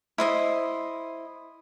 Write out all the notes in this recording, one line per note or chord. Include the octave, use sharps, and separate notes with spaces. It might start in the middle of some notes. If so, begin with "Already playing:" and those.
E4 C5 D#5